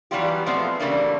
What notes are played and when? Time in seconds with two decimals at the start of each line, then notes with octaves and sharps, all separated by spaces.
0.11 E3 F#3 G3 B3 F4 G4
0.46 B2 F3 G#3 A3 B3 C4
0.80 C#3 E3 G3 A3 A#3 D4